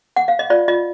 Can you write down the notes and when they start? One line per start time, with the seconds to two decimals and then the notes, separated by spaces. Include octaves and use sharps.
0.16 F#5
0.28 F5
0.39 D#5
0.50 F4 D5
0.68 F4 D#5